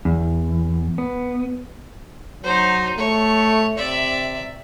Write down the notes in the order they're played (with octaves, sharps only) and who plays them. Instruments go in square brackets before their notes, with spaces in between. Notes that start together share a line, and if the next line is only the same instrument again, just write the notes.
[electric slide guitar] E2
B3
[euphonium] F#3 [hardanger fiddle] D#4 C5
[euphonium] A3 [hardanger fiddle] C#5
[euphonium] C3 [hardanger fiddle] D5 E5